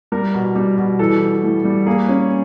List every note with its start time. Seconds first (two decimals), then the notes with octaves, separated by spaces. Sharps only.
0.12 G3 A#4
0.34 B2
0.55 G3
0.78 B2
0.99 E3 A4
1.21 E3
1.43 A2
1.65 G3
1.86 A#3 G#4
2.09 C#4